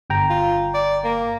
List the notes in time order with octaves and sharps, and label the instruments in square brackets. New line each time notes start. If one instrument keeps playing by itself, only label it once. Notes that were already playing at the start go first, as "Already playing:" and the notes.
[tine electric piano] G1 G5 A#5
[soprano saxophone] F4
D5
A#3